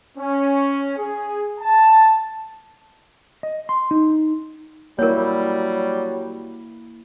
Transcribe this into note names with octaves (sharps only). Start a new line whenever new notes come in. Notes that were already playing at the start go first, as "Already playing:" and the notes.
C#4
G#4
A5
D#5
C6
D#4
F#3 G3 A#3 E4 A#4 C#5